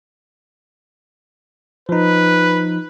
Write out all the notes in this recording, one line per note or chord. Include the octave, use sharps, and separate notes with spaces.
F3 D#4 B4